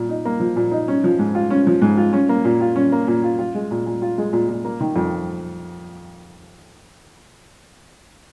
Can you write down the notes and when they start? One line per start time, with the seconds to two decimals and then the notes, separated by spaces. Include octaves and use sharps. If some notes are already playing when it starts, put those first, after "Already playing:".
Already playing: A#2
0.09 D#4
0.25 A#3
0.40 F3
0.56 A#2
0.71 D#4
0.88 C#4
1.04 F3
1.19 G#2
1.35 F4
1.50 C#4
1.67 F3
1.82 G#2
1.97 F4
2.13 C#4
2.29 A#3
2.45 A#2
2.61 F4
2.76 C#4
2.92 A#3
3.07 A#2
3.23 F4
3.39 F4
3.55 G#3
3.71 A#2
3.86 A#2
4.02 F4
4.18 G#3
4.33 A#2
4.49 A#2
4.65 A#3
4.81 D#3
4.96 F2